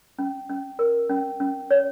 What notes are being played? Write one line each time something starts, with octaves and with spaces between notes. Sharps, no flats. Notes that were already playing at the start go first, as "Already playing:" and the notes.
C#4
C#4
A#4
C#4
C#4
C#5